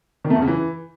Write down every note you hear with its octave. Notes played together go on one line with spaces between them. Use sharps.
D#3
A3
E2
C#3
E3